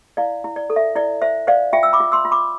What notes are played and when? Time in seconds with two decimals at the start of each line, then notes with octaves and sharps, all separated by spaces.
0.17 E4 D5 F5
0.44 E4
0.56 D5
0.70 A4
0.76 E5
0.96 E4 D5
1.22 C5 E5
1.47 C5 D5 F5
1.73 F4 E5 G5
1.83 E6
1.93 B5 D6
2.00 F4
2.12 C6 E6
2.25 F4
2.32 B5 D6